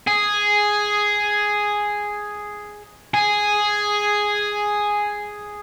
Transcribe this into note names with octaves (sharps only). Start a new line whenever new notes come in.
G#4
G#4